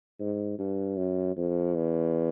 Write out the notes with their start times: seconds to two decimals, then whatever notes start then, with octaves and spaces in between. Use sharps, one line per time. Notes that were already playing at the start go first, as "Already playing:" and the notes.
0.19 G#2
0.58 G2
0.97 F#2
1.36 F2
1.75 E2